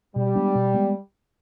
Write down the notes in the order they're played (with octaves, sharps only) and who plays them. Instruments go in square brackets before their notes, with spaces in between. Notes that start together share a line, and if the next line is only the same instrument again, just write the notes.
[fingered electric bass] B2 [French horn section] G3
[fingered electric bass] G#3 B3 D4
B2
G#3 B3